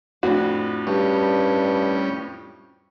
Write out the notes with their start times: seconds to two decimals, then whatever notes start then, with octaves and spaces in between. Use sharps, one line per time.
0.23 F2 A2 D4 F#4
0.87 G2 G3 C#4